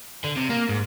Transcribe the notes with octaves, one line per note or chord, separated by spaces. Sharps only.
D3
C3
A#3
G#2